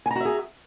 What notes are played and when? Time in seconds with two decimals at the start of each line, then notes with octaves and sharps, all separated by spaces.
0.06 G#5
0.11 A#5
0.15 F#4
0.20 E5
0.25 G#4